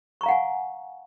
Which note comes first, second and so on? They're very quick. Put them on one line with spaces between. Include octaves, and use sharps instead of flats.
C#6 A#5 F5 F#5 G#5